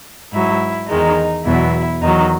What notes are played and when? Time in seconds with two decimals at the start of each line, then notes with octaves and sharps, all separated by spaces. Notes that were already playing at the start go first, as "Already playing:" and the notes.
0.33 G#2 F#3 E4
0.89 E2 D#3 G#3 D#4
1.45 E2 B2 F#3 E4
2.01 E2 D#3 F#3 D#4